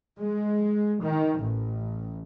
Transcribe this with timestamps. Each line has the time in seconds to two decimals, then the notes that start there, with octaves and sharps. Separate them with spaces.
0.18 G#3
1.02 D#3
1.40 A1